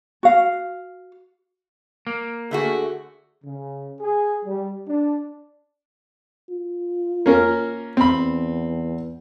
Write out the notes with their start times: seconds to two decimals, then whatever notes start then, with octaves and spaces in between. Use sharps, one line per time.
0.23 F#4 F5
2.07 A#3
2.51 D3 A3 F#4 G#4
3.45 C#3
4.01 G#4
4.46 G3
4.87 D4
6.51 F4
7.26 A#3 C#4 A#4
7.97 E2 C4 B5